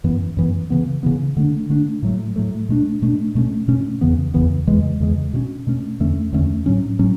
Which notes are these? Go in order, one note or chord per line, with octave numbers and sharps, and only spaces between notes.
F#2 E3 B3
F#2 E3 B3
C#3 E3 B3
C#3 E3 B3
D3 A3 D4
D3 A3 D4
A2 F#3 A3
A2 F#3 A3
B2 A3 D4
B2 A3 D4
B2 A3 C#4
B2 A3 C#4
E2 C#3 E3 B3
E2 C#3 E3 B3
E2 C#3 E3 G#3
E2 C#3 E3 G#3
B2 A3 C#4
B2 A3 C#4
E2 D3 A3 C#4
E2 D3 A3 C#4
A2 F#3 C#4
A2 F#3 C#4